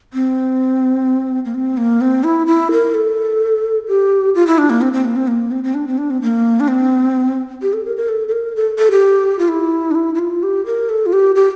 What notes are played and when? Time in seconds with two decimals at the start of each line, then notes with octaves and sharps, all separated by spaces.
0.13 C4
1.45 A#3
1.54 C4
1.77 A#3
2.01 C4
2.24 E4
2.47 E4
2.71 A#4
2.94 A4
3.88 G4
4.35 F4
4.47 E4
4.58 D4
4.70 A#3
4.81 C4
4.93 C4
5.05 A#3
5.16 C4
5.28 A#3
5.52 C4
5.64 C4
5.75 D4
5.87 C4
5.98 D4
6.11 C4
6.22 A#3
6.60 D4
6.68 C4
7.62 G4
7.73 A4
7.85 A#4
7.97 A#4
8.09 A4
8.28 A4
8.32 A#4
8.56 A4
8.78 A4
8.91 G4
9.39 F4
9.48 E4
9.91 D4
9.95 E4
10.15 E4
10.19 F4
10.43 G4
10.66 A#4
10.89 A4
11.06 F4
11.13 G4
11.36 G4